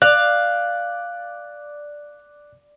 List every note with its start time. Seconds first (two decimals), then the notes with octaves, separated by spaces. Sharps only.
0.02 D5 F5 F#6